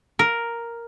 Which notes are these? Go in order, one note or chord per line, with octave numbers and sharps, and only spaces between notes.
A#4